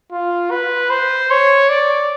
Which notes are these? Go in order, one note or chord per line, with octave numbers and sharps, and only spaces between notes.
F4
B4
C5
C#5
D5